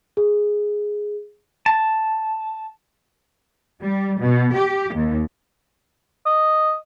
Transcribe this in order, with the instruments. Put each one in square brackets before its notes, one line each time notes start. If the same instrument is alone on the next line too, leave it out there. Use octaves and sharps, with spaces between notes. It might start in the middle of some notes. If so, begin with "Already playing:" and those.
[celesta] G#4
[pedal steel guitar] A5
[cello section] G3
B2
G4
D#2
[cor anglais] D#5